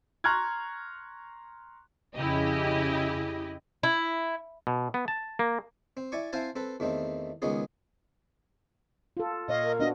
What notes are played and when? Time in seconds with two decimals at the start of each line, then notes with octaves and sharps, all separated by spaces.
0.24 A#5 C6 C#6 F6 F#6 G#6
2.15 F2 C#3 E4 G4 D#5
3.83 E4
4.67 B2
4.94 B3
5.08 A5
5.39 A#3
5.97 C4
6.12 E4 D5 G#5 C#6
6.33 C4 E4 C5 F5 G#5 A5
6.56 C4 A4 B4
6.80 E2 D#3 A3 C4
7.42 C#2 D#3 B3 C#4 G#4
9.17 F4 A4
9.48 A#2 C#5 D#5 F5
9.63 A#4
9.79 B3 D4 F#4 D#5